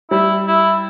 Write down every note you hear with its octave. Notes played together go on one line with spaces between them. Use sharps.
G3 E4
E4